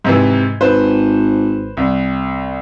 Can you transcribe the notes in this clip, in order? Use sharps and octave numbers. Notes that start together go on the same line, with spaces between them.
G#2 C3 E3
G#1 B4 C5
C2